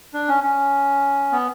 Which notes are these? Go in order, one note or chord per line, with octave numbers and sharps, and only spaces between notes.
D4
C#4
C#4
B3